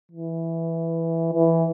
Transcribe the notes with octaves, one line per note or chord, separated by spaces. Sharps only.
E3
E3